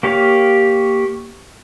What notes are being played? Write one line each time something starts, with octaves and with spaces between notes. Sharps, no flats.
A#3 G4 C#5 F5